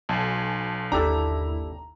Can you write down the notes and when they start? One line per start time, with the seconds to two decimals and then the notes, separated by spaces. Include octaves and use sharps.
0.09 B1 G#5 A5
0.92 G1 D#2 D4 E4 G4 A4 A#5